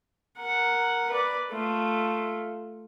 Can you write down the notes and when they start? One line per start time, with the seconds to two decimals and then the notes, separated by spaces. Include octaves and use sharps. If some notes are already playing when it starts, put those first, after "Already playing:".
0.38 A#4 F#5
1.09 B4 D5
1.51 A3 F4